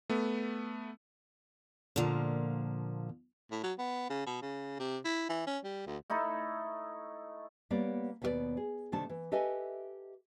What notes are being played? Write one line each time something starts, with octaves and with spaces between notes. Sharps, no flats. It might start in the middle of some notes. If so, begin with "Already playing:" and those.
A3 B3
A#2 D3 F3 A#3
A2
F#3
B3
C#3
B2
C#3
C3
E4
E3
C#4
G3
D2
A3 D#4 E4 A4
G3 A#3 B3 C#5 D5
D#2 B2 B3 F#4 B4 D5
G#4
C3 D#3 A3 D4 A5
E3
G4 A4 B4 D#5 E5 G#5